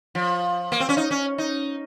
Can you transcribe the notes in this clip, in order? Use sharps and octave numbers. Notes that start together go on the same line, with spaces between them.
F3
A#3
C4
C#4
D#4
C#4
D#4